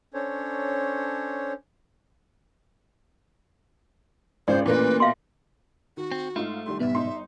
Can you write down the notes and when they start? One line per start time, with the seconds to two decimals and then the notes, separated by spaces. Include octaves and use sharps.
0.14 C#4 D4 A4 C5 C#5
4.48 G#1 C#2 C5 D5
4.66 A1 A#2 A#3 B4
5.00 B2 E5 F5 C6
5.97 D#3 F#4
6.12 C4
6.36 G#2 A3 D#4 F4
6.66 C2 D#3 G3 C6
6.80 B1 G#2 B3 E5
6.95 G1 D#4 C6